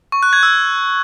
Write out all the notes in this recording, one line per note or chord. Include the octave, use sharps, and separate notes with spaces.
C#6
F#6
G#6
E6